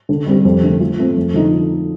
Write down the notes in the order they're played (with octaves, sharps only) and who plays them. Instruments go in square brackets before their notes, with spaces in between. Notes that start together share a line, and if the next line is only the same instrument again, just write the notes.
[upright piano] D3
G3 C4 G4
F2
D3 A3
F3
A3 C4
F2
D3 F3 D#4